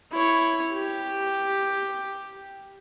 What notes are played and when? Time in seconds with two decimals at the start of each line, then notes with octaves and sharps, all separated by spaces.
0.12 E4 C#5
0.73 G4